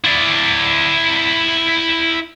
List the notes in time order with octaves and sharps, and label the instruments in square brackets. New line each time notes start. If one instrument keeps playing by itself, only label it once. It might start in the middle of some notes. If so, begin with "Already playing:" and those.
[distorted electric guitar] E4 D5